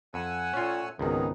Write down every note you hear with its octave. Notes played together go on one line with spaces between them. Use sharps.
F2 F#5 G#5 E6
A#2 A3 C#4 F4 C#5
G#1 C#2 D#3 B3 D#4 G#4